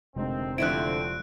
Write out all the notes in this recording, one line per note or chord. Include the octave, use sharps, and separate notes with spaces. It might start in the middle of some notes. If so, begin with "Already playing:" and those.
F1 D2 C3 D#3 G#3 C4
D3 F3 A3 C4 E4 F#6 D7